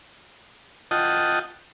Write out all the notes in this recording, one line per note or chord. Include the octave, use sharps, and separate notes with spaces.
F4 D#5 F#5 G5 A5 D#6